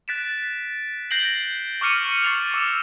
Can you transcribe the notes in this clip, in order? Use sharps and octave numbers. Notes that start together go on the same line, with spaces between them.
F#6 A6 B6 D7 E7
G6 A#6 C7 D7 F#7 G7
C#6 D6 F6 C#7 D#7
C#6 A6 C7 C#7 F7
D6 E6 E7